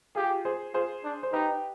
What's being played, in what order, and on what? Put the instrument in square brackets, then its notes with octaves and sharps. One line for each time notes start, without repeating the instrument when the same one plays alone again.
[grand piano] F4 G#4 [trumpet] G4
[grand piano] G#4 C5
[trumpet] F4 [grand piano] G#4 C5
[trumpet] D4
[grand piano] C5
[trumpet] D#4 [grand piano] G4 B4